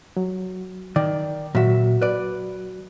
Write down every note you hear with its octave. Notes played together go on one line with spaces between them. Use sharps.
F#3
D#3 D5
A#2 F#3 F#4 E5
B4 D5